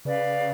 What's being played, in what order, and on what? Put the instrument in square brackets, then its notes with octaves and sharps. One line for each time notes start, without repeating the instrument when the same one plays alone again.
[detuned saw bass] C#3 [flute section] B4 D5 F5